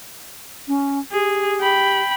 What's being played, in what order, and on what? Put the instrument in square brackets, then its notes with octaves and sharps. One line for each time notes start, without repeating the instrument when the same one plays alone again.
[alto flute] C#4
[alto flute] G4 [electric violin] G#4
[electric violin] G5 B5